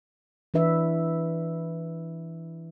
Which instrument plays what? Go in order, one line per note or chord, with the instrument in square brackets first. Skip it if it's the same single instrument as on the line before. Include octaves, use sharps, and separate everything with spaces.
[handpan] E3 D4 B4 E5